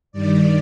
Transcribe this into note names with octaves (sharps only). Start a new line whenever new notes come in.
G2 D#3 G3 D5